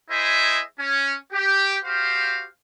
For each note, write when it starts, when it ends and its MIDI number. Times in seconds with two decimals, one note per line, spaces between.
0.10 0.60 64
0.10 0.60 68
0.10 0.60 72
0.10 0.60 75
0.10 0.60 76
0.79 1.15 61
1.32 1.77 67
1.84 2.45 66
1.84 2.45 67
1.84 2.45 72
1.84 2.45 77